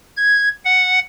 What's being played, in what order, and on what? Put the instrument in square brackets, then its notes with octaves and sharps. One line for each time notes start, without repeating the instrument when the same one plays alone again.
[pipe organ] G#6
F#5